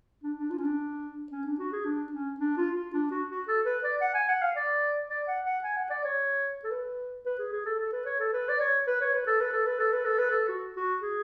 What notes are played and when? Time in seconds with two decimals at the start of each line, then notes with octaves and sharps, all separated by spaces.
0.23 D4
0.38 D4
0.50 F4
0.58 C#4
0.64 D4
1.32 C#4
1.46 D4
1.59 F#4
1.73 G#4
1.85 D4
2.12 C#4
2.40 D4
2.57 F4
2.76 F4
2.94 D4
3.11 F#4
3.30 F#4
3.48 A4
3.66 B4
3.84 D5
4.01 F#5
4.14 G#5
4.29 F#5
4.41 F5
4.56 D5
5.09 D5
5.27 F#5
5.45 F#5
5.64 G#5
5.76 F#5
5.90 D5
6.04 C#5
6.64 A4
6.71 B4
7.26 B4
7.39 G#4
7.53 G#4
7.66 A4
7.79 A4
7.92 B4
8.05 C#5
8.20 A4
8.33 B4
8.49 D5
8.60 C#5
8.87 B4
9.01 C#5
9.14 B4
9.27 A4
9.40 B4
9.53 A4
9.66 B4
9.79 A4
9.93 B4
10.05 A4
10.18 B4
10.31 A4
10.48 F#4
10.76 F#4
11.02 G#4